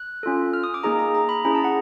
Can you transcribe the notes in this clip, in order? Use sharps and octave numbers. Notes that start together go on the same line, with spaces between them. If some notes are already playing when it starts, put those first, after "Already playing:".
Already playing: F#6
C#4 F4 A4
F6
D#6
D6
A#3 D#4 G#4 A#5
A#5
A#5
B5
C#4 E4 G#4 A#5
A5
F#5